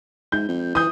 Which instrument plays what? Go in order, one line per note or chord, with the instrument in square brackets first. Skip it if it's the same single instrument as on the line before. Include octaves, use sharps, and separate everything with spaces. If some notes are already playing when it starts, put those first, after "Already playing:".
[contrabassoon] G#2 [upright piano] G6
[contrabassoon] F2
[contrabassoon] E3 [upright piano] D#6 G6